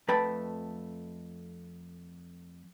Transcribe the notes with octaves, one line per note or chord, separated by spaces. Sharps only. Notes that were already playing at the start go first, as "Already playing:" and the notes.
F2 A3 B4 G5 A5 B5